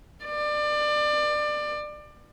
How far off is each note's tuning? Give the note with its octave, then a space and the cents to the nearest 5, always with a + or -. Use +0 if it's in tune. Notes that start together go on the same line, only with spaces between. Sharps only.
D5 +25